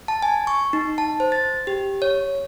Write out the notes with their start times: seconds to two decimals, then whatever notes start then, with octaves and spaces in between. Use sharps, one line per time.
0.08 A5
0.22 G#5
0.47 C#6
0.73 D#4
0.98 A5
1.20 C5
1.32 A6
1.67 G4
2.02 C#5